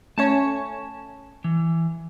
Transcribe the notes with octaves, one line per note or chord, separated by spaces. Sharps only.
A3 C#4 C#5 A5
E3